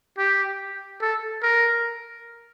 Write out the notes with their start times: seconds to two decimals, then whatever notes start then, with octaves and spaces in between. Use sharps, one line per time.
0.18 G4
1.01 A4
1.43 A#4